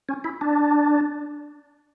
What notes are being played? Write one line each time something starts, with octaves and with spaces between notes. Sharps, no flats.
C#4
E4
D4